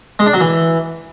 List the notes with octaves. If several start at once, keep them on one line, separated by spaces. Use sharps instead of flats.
G#3
D4
F#3
E3